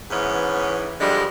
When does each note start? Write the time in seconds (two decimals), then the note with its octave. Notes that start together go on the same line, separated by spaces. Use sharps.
0.10 G#2 E3 B3 C#4
1.00 D3 F3 G3 G#3